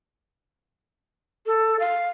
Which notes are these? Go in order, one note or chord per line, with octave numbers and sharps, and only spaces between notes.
A4
F5